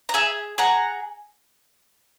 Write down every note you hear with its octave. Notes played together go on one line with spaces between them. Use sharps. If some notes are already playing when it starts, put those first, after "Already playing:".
A#5
G#4 E5 G#5
G#4 F#5 A#5